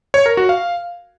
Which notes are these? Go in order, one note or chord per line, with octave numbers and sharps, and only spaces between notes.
C#5
A#4
F#4
F5